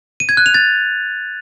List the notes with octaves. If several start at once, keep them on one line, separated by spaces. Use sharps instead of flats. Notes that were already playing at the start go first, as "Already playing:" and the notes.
D#7
G#6
F#6
F7
A6